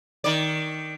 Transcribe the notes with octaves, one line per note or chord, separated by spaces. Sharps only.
D#3 D5